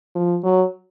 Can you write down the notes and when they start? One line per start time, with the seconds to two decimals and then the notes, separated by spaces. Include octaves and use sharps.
0.15 F3
0.43 F#3